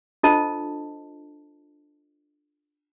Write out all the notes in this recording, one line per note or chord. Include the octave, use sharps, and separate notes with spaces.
D4 F4 A4 C5 D#5 A5